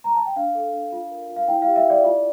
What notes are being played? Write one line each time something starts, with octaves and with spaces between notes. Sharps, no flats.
A#5
A5
G5
D4 F5
A4
D4
F4
A#4
F4
F5
E4 G5
G4 F5
E5
E4 D5
F4